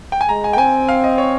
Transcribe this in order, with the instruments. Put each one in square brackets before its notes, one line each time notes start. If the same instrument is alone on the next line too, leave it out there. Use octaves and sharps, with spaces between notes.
[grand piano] G5
G#5
[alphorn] G#3 [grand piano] A#5
[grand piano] G#5
G5
[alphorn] C4 [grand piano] G#5
[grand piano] F5
D#5
C#5